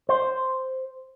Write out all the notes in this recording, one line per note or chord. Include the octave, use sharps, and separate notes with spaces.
C5